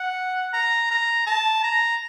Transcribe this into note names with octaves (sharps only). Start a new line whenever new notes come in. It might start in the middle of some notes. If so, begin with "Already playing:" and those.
Already playing: F#5
A#5
A#5
A5
A#5